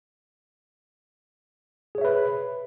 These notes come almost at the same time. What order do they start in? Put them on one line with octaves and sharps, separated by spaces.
G#4 C#5 E5 B4